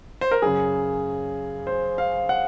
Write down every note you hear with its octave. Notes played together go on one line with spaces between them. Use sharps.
C5
A#4
F#2 C#3 G#4
C5
F5
F#5